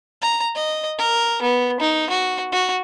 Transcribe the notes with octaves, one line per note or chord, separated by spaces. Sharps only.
A#5
D#5
A#4
B3
D#4
F#4
F#4